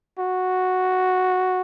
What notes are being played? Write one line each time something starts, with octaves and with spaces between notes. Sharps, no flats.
F#4